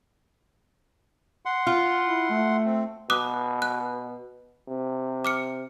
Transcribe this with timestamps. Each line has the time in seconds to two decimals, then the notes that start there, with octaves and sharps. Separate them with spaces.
1.46 F#5 C6
1.67 F4
2.05 E4
2.30 A3
2.65 C4
3.10 B2 D6 D#6 F#6
3.62 F#6
4.68 C3
5.25 D6 F6 C#7